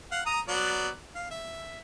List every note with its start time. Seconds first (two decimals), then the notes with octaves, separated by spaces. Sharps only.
0.12 F5 F#5
0.26 A#5 D#6
0.48 F#3 B3 D5
1.15 F5
1.31 E5